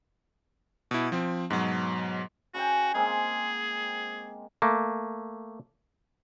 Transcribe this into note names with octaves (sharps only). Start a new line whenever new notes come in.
B2 E4
F3 C4
G#2 B2 F#3
C#3 F#4 F#5 G5
G#3 A#3 C4 G#4
A3 A#3